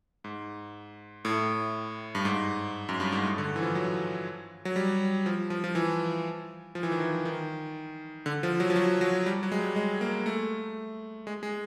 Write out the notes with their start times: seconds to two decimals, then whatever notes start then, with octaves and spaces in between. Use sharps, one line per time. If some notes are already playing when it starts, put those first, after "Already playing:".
0.24 G#2
1.25 A2
2.15 G2
2.25 G#2
2.89 F#2
3.00 G2
3.12 G#2
3.25 A2
3.38 D3
3.56 E3
3.62 F3
3.75 F#3
4.65 F#3
4.76 G3
5.26 F3
5.50 F3
5.64 F3
5.75 E3
6.75 F3
6.83 E3
6.92 D#3
7.00 E3
7.25 D#3
8.26 D3
8.43 F3
8.60 F#3
8.70 F3
8.76 F#3
9.01 F#3
9.26 G3
9.43 F#3
9.52 G#3
9.59 G3
9.76 G#3
10.01 A#3
10.26 A3
11.27 G#3
11.43 G#3